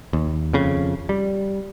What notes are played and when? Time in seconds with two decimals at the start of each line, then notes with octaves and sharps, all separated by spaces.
0.13 D#2
0.53 F2 C#3
1.09 G3